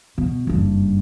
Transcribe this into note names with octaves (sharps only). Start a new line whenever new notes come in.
B2
F#1 G2